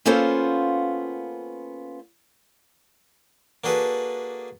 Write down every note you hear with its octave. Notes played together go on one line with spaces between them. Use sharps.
A#3 B3 C#4 F4 A4 C5
A#3 D4 F#4 G#4 A4 B4